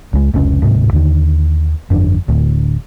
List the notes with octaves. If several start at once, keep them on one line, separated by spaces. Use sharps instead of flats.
C#2 G#3
F1 C#2 C#4
D1 G#2 C3
D#2 D3 D#3
G1 F2 D4
D1 D2